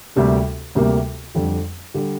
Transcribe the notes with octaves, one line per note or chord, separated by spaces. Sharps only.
D2 C3 G3 A#3
D2 C3 G3 A#3
F2 D3 G3
D3 G3